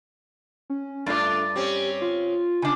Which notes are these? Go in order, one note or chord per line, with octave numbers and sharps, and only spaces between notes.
C#4
G2 A3 D4 F4 D5 A6
C4 C#4 G4
F4
C#3 D4